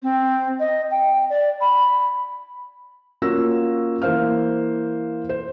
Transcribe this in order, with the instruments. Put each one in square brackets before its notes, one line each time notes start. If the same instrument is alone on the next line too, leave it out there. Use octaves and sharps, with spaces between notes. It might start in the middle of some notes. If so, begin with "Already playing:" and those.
[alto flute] C4
D#5
G5
D5
B5
[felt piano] A#3 C#4 F4 F#4 E6 A#6
E3 A#3 C5 F5 F6
C5